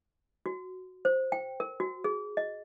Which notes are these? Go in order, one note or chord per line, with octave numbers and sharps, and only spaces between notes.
F#4
C5
G5
A#4
F#4
G#4
D#5